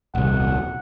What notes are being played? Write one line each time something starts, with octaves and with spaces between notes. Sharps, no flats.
D#1 C2 F#5